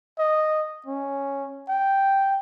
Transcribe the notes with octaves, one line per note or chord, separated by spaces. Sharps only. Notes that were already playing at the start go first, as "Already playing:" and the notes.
D#5
C#4
G5